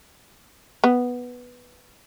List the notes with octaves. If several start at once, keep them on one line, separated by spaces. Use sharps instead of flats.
B3